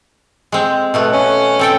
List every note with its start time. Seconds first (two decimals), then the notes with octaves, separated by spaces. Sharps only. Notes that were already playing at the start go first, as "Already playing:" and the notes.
0.52 G#3 C4
0.94 B2 A3 B3
1.12 C#4
1.59 C4 A4 G5